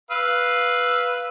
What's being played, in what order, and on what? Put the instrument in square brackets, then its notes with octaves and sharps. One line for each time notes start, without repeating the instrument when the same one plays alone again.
[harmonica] B4 F5 E6